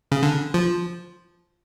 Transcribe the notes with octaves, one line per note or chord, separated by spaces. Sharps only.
C#3
D3
F3